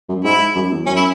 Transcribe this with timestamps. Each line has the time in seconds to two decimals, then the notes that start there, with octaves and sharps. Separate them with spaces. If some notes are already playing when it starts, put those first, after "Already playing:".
0.09 F#2
0.24 G#2 E4
0.55 F#2
0.71 E2
0.86 F#2 C#4
0.96 E4